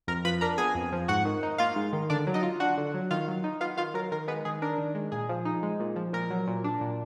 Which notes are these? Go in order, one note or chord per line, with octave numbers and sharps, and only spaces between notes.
F2 A#4 A#5
F3 B4 B5
D4 A#4 A#5
B3 G#4 G#5
F2
F3
G#2 F#4 F#5
D#3
D#4
A#3 F4 F5
G#2
D#3
D3 D4 D5
F#3
D#4 D#5
F4
D4 F#4 F#5
D3
F#3
D#3 F4 F5
F#3
D#4
B3 F4 F5
D#3 F4 F5
F#3 A#4
D#3 A#4
G#3 B3 B4
D#3 G#4
D4 A#4
D#3
G#3
A#2 G#4
F3
D#4
G#3
A#2
F3
A#2 A#4
F#3
A#2
D4
A#2